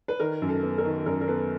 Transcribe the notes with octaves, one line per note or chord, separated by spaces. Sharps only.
B4
D#3 A#4
F#2
A4
B3
A#4
D#3
F#2 A#4
A#4
B3 A4 B4